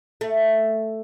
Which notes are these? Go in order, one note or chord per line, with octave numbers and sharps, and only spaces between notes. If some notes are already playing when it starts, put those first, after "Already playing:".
A3